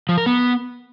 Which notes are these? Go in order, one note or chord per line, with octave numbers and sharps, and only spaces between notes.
F3
A#4
B3